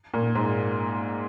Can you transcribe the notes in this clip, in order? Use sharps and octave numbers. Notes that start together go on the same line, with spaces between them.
A#2
G#2